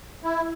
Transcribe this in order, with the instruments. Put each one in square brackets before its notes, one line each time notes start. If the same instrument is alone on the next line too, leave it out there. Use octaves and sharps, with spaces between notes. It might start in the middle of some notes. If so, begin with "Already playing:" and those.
[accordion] E4